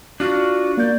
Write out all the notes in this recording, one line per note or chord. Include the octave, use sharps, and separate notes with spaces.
D4 F4 F#4
A#3 D5 G6